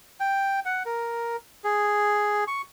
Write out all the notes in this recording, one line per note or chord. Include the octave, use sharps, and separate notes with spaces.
G5
F#5
A#4
G#4
C#6